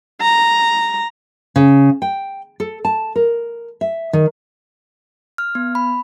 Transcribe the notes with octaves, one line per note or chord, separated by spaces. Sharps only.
A#5
C#3
G5
A4
A5
A#4
E5
D#3
F6
B3
B5